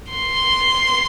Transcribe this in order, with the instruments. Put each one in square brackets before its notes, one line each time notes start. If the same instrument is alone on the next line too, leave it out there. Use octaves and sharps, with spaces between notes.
[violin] C6